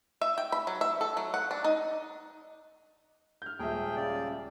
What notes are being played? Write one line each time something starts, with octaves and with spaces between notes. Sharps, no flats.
E5
G5
B5
F#3
E5
A4
F#3
F#5
D4
D#4
F6 G6
D#1 G#3 G#4 E5 G5
C#3 D5